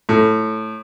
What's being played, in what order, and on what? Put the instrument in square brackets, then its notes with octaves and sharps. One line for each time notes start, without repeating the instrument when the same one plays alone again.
[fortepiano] A2